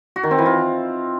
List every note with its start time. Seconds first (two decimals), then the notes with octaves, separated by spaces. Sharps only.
0.16 F#4
0.23 D#3
0.31 C4
0.38 E3
0.46 F4